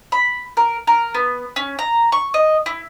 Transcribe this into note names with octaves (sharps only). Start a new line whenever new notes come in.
B5
A#4
A#4
B3
C#4
A#5
C#6
D#5
E4